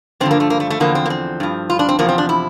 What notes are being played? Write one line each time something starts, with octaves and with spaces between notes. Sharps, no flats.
G2 D3 F3 C4
A#3
A3
A#3
A3
A3
E2 D3 F3 A#3
C4
A#3
C4
G2 F3
F4
D4
C4
E2 C3 F3 A#3
C4
D4
E4